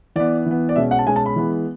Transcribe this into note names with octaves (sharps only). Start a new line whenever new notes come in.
E3 B3 D5
E3 B3
D5
B2 G#3 C#4 E5
F#5
A5
B2 G#3 C#4 G#5
A5
B5
E3 G#3 B3